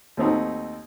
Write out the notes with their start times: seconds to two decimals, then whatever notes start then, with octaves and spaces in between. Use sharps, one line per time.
0.17 D#2 A3 C4 D#4 F#4